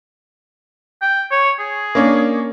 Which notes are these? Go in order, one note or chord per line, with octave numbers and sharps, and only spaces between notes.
G5
C#5
G#4
A#3 C#4 D4